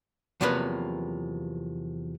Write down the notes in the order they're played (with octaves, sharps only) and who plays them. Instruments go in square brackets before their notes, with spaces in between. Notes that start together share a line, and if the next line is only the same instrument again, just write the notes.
[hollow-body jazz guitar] E2 C3 F3 F#3 A#3 B4